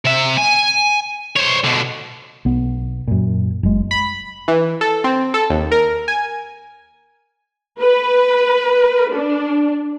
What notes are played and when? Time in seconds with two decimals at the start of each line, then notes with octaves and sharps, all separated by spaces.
0.05 C3 E5
0.38 G#5
1.37 C5 C#5
1.64 B2 D3
2.45 B1 B3
3.08 F#2 A#2
3.63 F#1 G#3
3.91 B5
4.48 E3
4.81 A4
5.04 C4
5.34 A4
5.50 D#2
5.72 A#4
6.08 G#5
7.81 B4
9.13 D4